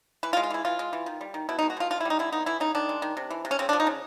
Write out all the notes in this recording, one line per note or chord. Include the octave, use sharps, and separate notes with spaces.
E3 B4
F4
G#3
F4
E3 E4
E3 F4
G#3
E3
D#3
G3
D#3
B2 E4
D#4
G#3
F#4
B2 F4
D3 F4
E4
G3
D#4
D3 E4
B3 D#4
E3 E4
C#3 D#4
D#3 D4
G#3
D#3
C3
E3
C3
C#4
C#3 C4
D4
F3
D#4
C#3